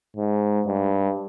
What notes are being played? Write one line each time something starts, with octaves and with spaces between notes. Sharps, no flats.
G#2
G2